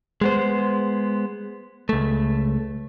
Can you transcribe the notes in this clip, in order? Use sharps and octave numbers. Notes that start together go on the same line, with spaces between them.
G#3 B3 C5
C#2 A3